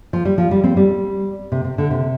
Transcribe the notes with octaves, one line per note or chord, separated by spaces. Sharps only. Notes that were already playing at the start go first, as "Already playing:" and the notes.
F3
G3
F3
G3
C4
G3
C3
C3
D3
C3